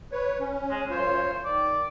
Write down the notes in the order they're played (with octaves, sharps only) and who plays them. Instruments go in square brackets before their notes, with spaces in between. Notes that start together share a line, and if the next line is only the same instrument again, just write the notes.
[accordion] B4 C#5
C#4
[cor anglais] G#3
[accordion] F#2 F4 C#5 [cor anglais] C5
[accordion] D#3 [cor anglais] D5